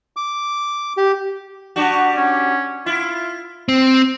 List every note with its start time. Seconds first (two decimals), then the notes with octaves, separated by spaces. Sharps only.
0.17 D6
0.97 G4
1.76 G3 D4 F#4
2.16 C#4
2.86 E4 F4
3.69 C4